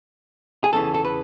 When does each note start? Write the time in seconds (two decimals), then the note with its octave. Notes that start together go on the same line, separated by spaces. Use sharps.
0.64 G#4
0.73 E2 C#3 E3 A4
0.94 A4
1.05 B4